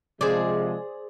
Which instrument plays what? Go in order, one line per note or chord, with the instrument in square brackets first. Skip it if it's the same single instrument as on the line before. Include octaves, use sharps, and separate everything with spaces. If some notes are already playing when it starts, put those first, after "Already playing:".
[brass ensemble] C3 F3 G#3 [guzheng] G#4 C5 D5